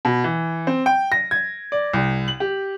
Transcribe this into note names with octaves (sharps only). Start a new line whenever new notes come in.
B2
E3
C4
G5
A#6
G#6
D5
C2
F#7
G4